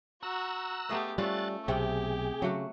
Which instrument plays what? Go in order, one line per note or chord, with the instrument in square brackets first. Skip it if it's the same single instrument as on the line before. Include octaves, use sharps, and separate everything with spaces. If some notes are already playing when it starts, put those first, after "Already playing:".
[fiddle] F#4 [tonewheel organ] A#5 E6 F#6
[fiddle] A3 G4 [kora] B3 G#4 D#5
[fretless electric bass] G3 [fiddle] A3 [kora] C#4 F4 C5 [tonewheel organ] F#6 A6
[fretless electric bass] B1 [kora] C3 A3 C4 [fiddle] G4 [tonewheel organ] G#4 G5
[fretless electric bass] C#3 [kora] F#3 A3 F#4